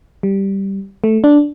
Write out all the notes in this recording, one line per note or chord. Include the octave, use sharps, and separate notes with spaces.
G3
A3
D4